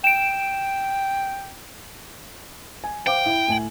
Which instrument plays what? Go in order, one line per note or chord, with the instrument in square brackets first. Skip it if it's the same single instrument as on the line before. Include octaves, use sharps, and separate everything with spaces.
[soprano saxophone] G5 [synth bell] D7 E7
[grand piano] G#5
[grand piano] C5 F5 D6 [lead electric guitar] G5
[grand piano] E4
A2 G#5 F#7